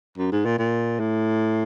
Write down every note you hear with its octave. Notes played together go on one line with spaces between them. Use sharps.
F#2
G#2
A#2
A#2
A2